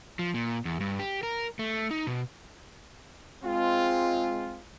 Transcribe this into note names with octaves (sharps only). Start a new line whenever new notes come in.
F3
A#2
E2
G2
G4
A#4
A3
D#4
B2
G#3 C4 F4